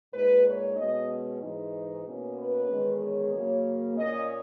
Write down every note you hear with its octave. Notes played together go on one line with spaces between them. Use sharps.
A#2 G#3 D#4 B4
C#5
B2 G#3 C#4 D#5
G#2 E3 G#3 D#4
B2 A#3 C#4
B4
E2 D#3 G#3 C#4
C#5
C#3 F#3 A#3
A#2 A#3 C#4 D#5